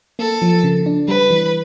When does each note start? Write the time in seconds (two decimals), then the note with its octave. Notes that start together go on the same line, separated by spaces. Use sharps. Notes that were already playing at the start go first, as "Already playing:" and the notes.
0.19 A#3 A4
0.42 F3
0.64 C#3
0.86 D4
1.08 G3 B4
1.31 E3